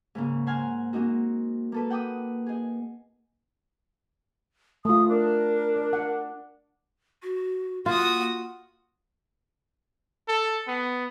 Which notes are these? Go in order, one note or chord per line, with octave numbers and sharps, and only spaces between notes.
G#2 C#3 A#3
C5 F#5 G#5 A#5 F6
G#3 A#3 C4 D#4 F#4
A#3 A4 B4
F#5 G5 D6 D#6
D#4 G#4
A3 F4 D#6
D4 A#4
D5
F#5
F#4
A#3 F4 F#4 D#6
A4
B3